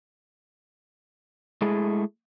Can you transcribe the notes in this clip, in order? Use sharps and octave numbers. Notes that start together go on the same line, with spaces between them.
G#3 A3 E4 G#4